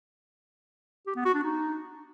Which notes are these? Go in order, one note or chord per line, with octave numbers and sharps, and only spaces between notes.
G4
B3
F#4
D4
D#4